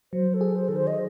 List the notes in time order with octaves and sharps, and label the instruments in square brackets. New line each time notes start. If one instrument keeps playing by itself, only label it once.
[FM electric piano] F#3 [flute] C5
[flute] A4
[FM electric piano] G#4
[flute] C5
[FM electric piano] D#3 [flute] A4
[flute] C5
D#5